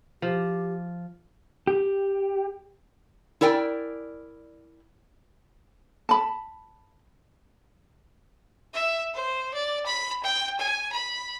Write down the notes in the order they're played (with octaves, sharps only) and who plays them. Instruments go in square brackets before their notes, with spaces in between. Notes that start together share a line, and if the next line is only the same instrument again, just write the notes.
[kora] F3 [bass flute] G4
[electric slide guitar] G4
[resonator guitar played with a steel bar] E4 A#4 D5 G5 G#5
[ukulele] A5 B5
[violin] E5
C5
D5
B5
G5
G#5
B5